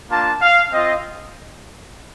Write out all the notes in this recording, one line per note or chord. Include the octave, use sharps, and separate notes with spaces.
A#3 D4 F4 A5
F5
C4 F4 D#5